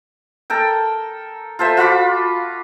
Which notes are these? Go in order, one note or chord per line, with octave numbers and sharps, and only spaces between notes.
A4 A#4 G5
F4 A4 C5 E5
F4 F#4 B5 D6